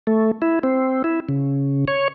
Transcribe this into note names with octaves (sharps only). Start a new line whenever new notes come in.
A3
E4
C4
E4
C#3
C#5